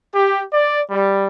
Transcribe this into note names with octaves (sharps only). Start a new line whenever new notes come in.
G4
D5
G3